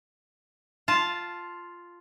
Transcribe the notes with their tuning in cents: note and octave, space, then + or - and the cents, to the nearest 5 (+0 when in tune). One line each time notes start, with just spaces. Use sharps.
F4 +0 A5 +0